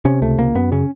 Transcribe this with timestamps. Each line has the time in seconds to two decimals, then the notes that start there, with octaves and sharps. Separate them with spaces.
0.05 C3 C#4
0.22 C#2 A3
0.38 C#2 A#3
0.55 F#2 B3
0.72 C#3 C#4